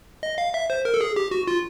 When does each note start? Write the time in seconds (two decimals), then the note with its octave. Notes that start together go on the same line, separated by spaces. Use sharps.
0.23 D#5
0.38 F5
0.54 E5
0.70 C5
0.85 A#4
0.94 A4
1.01 G#4
1.16 G4
1.31 F#4
1.47 F4